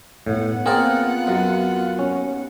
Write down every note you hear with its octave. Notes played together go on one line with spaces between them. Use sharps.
A2 B3 F#5
A#3 C4 F4 G#4 A#4 D5 F#6
F#2
D#2 C#4